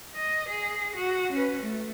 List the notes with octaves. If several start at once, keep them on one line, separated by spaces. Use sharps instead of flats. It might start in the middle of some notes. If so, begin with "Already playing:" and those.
D#5
G#4
F#4
C#4 B4
A3